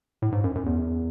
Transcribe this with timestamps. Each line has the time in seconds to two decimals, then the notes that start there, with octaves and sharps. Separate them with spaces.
0.22 A2
0.32 G#2
0.44 F#2
0.55 F#2
0.66 E2